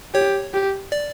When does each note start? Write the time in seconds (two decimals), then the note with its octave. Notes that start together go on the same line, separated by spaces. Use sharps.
0.14 G4 C#5
0.54 G4
0.92 D5